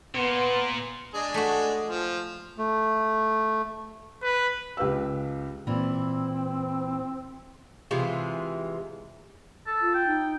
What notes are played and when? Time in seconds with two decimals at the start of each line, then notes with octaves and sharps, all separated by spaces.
0.15 A#2 B3 C6
1.14 G#3 D4 G#4
1.34 A3 F#4
1.86 F3
2.58 A3
4.23 B4
4.77 C#2 G4 B4 F5 E6
5.67 A#2 E3 C4 E4
7.91 C3 E3 G#3 F4
9.67 A4
9.81 F4
9.94 G5
10.07 D#4